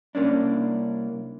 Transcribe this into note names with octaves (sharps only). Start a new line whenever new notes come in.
C2 A#3 C#4 D4